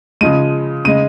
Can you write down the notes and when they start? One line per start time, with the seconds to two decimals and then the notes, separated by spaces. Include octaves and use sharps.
0.21 C#3 F3 G#3 D#7
0.85 C#3 G#3 D#7